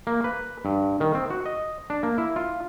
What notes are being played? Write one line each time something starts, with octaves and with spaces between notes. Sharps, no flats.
A#3
B4
G2
D#3
C4
F#4
D#5
D4
A#3
E4
F4